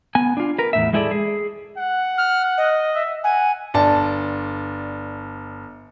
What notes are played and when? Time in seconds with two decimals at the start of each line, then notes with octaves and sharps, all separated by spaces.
0.15 B3 G#5
0.37 D4 F4
0.58 A#4 B4
0.73 E2 A2 E5
0.93 G#3 A3 E4 G#4 A4 D5
1.11 G#4
1.78 F#5
2.17 F6
2.57 D#5
2.95 E5
3.24 F#5 G#5
3.74 G1 D5 A5